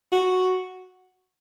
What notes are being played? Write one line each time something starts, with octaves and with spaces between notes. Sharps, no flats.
F#4